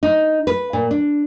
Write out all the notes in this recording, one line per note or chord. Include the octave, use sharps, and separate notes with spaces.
D#4
B4
A#2
D4